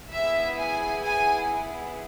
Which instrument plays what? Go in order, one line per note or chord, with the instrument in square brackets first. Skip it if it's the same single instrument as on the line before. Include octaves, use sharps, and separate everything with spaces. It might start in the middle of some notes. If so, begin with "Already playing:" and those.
[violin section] B3 E4 G#4 E5
G#5
G#5